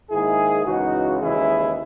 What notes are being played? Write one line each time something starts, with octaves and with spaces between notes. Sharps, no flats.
G#2 D#3 A#3 E4 G#4
C#2 C#3 E3 D#4 F#4
D#2 C#3 E3 G#3 E4 G#4